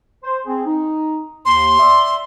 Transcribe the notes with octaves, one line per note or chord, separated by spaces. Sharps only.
C5
C4 G#4
D#4
D#2 C6
D5 E5